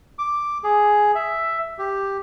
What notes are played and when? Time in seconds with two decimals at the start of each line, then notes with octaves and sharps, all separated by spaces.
0.19 D6
0.64 G#4
1.15 E5
1.79 G4